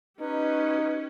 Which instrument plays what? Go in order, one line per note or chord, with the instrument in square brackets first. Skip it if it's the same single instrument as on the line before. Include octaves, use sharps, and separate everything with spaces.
[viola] C#4 G4 [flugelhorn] D#4 [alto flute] B4